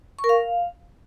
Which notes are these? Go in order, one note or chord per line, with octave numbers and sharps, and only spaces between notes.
C#6
A#4
F5